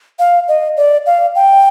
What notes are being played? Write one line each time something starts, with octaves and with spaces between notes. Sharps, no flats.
F5
D#5
D5
F5
G5